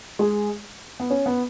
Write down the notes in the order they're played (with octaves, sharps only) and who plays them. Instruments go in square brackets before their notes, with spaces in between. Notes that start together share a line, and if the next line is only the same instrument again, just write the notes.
[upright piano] G#3 G#4
B3
C#4
B3